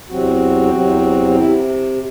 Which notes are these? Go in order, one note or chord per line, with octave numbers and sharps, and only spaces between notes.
E2 C3 F#3 C4 F#4
E2 C3 F#3 C4
C3 E4